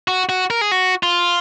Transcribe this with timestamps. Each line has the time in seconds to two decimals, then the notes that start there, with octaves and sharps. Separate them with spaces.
0.08 F#4
0.29 F#4
0.50 A#4
0.61 G#4
0.71 F#4
1.03 F4